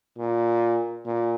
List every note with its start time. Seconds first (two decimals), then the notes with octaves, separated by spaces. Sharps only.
0.18 A#2
1.06 A#2